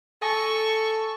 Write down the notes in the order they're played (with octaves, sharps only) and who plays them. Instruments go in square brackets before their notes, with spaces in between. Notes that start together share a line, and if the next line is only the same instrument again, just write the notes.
[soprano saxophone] A4 [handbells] G#5 D#6 A#6 [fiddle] C#6